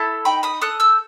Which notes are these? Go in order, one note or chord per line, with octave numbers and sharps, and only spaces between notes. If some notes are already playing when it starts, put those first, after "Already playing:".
Already playing: E4 A4
D#4 G5 B5
B5 D#6
A4 D#6 F#6
E6 G6